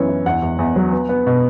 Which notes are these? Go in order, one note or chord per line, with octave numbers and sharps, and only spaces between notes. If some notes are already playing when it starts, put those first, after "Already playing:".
Already playing: F#2 E3 B3 C#5
E4
E2 F#5
E2
E2
F#3
B3
B3
B2